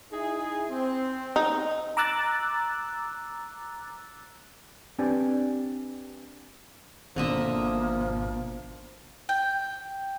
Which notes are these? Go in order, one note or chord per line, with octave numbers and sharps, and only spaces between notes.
D#4 E4 G#4
C4
D#4
A#5 D6 E6 F#6 A6
C4 D4 G4 B4 D5 G#5
G#1 B2 D3 F3 A#3 D#5 E5
G5